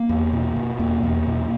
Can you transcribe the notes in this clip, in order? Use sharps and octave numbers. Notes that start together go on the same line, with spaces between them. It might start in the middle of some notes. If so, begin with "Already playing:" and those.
Already playing: A#3
E2
B2
B2
E2 A#3
E2
B2